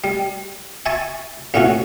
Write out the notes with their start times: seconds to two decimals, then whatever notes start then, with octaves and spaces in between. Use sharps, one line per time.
0.04 G3
0.86 E5 G#5 A5 C#6
1.54 A#1 A2 A3 C#4 F#4